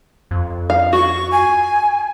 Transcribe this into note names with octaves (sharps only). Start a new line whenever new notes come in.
F2
F5
F#4 C#6
G#5